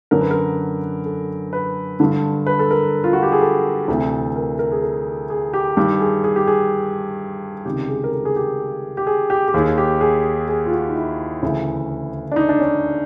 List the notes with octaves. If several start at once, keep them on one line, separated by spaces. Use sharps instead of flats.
F#2 D3 A#4
B4
A#4
A4
B4
G2 D3
B4
A4
A#4
F4
F#4
G4
G#4
A4
D2 C3 E3
A#4
A#4
G#4
A4
G#4
G4
G2 D#3 G4
G#4
G#4
G4
G#4
C#2 C3 D#3 G4
G#4
A#4
A4
G#4
G4
G4
G#4
G4
G4
D#2 D#3 G#4
G4
G#4
G#4
F4
F#4
D#4
E4
D2 C#3 E3
D4
D#4
D4
C#4